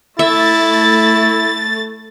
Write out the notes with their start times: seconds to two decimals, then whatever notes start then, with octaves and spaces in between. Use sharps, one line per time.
0.19 A3 E4 E5 A6